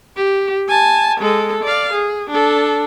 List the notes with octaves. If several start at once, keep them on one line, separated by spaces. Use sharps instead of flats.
G4
G#5 A5
G#3 A4
D5 F5
G#4
D4 A4